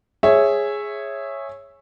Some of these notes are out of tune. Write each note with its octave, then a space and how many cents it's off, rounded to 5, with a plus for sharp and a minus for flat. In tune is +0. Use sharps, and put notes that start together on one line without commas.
G#4 +0 C#5 -10 E5 +0